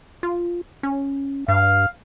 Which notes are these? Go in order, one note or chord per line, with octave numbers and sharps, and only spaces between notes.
F4
C#4
G2 F5